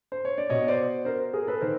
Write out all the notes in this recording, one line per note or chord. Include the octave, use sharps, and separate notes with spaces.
C5
C#5
D5
B2 C#5 D#5
C5 D5
A#4 C5
G#4 A#4
A4 B4
D#3 A#4 C5